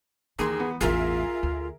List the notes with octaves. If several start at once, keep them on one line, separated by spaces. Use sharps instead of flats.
D#2 E3 A#3 G#4 C6
B3
A1 E2 F4 G#4 A#4 E5
D2